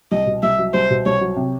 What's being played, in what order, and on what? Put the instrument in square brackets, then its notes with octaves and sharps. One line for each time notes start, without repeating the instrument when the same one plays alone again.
[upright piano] C2 [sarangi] D#5
[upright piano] B2
[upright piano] C2 [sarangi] E5
[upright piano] F#3
[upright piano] C2 [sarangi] C5
[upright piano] B2
[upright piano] C2 [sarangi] C#5
[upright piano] F#3
C3